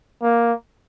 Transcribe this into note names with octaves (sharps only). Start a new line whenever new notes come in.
A#3